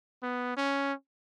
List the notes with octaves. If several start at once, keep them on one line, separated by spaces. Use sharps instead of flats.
B3
C#4